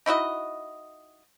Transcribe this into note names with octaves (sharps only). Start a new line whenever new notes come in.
D#4 E4 F#4 D#5